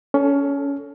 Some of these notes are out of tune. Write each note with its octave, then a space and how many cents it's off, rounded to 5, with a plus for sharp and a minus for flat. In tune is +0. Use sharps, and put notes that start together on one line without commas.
C#4 +20 A4 +0